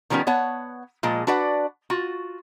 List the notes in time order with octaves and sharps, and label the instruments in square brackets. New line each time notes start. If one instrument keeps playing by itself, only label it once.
[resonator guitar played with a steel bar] D#3 F3 G3 B3 C#4
B3 C#5 F#5 A5
A#2 F3 G#3
D4 F#4 B4 D5 F#5
F4 F#4